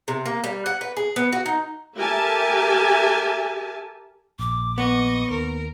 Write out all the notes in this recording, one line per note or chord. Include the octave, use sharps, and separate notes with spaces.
C3
A#3
G3
F#5
B4
G#4
B3
F#4
D#4
G4 A4 A#4 E5 G#5 A5
A#1 D6
B3 D#5 C#6
D#2 A#4